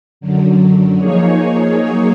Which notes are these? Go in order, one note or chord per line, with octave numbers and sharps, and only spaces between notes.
F#2 D3 F#3
F3 A#3 D#4 G#4 C#5
F#3 A#3 D#4 G#4 C#5